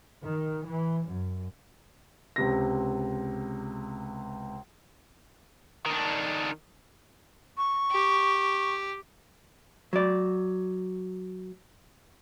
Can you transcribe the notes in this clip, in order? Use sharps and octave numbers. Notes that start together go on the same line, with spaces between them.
D#3
E3
F#2
C#2 C3 A#6
D#3 D4
C#6
G4
F#3 D5